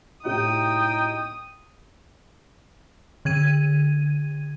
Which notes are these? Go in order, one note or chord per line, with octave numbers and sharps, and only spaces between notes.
A2 C3 D#4 F#4 G5 D#6
D3 G#6 D#7